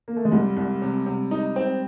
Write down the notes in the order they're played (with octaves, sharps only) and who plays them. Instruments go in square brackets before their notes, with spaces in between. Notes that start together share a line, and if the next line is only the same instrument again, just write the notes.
[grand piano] A#3
A3
G#3
[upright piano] C2 [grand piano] G3
[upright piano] C2
C3
C3
D#4
C4